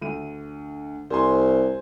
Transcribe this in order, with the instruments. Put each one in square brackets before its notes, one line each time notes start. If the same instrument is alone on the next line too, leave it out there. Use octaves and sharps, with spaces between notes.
[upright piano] D2 D#7
[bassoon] C2 [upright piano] C5 G#5 C6